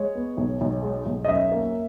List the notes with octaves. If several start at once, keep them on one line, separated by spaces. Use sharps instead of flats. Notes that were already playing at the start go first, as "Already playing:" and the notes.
Already playing: G#3 C#5
B3
B1
B1
G#3
B1
D#5
F#2 E5
A#3